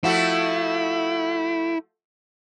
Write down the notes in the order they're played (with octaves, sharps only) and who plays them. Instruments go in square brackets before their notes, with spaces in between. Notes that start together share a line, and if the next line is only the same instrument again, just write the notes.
[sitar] F3 A3 F#4 [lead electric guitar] E4